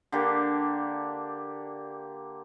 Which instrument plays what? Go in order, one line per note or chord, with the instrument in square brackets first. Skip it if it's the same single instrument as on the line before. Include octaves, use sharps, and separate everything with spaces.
[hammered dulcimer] D3 A#3 D4 G4